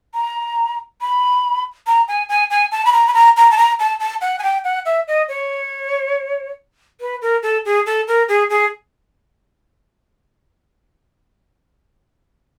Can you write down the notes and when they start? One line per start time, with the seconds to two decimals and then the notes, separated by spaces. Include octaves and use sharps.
0.14 A#5
1.01 B5
1.87 A#5
2.08 G#5
2.29 G#5
2.50 G#5
2.72 A5
2.85 B5
2.93 A#5
3.07 B5
3.14 A#5
3.37 A#5
3.51 A5
3.58 A#5
3.79 A5
4.00 A5
4.21 F#5
4.39 G#5
4.43 G5
4.64 F#5
4.86 E5
5.08 D#5
5.29 C#5
7.01 B4
7.22 A#4
7.43 A4
7.65 G#4
7.86 A4
8.08 A#4
8.28 G#4
8.50 G#4